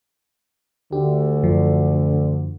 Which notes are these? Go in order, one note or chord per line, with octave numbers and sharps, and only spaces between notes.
D2 D3 G4
F#2 F3